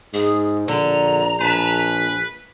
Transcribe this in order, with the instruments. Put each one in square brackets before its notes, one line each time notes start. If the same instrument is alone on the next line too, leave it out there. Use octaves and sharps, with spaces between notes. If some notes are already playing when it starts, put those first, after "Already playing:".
[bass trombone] G#2 [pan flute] G#4
[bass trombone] A#1 [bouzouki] D3 [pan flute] A#5
[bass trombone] A#1 [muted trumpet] B4 [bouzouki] G#5 A5